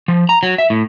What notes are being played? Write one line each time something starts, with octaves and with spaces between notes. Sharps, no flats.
F3
A#5
F#3
E5
A2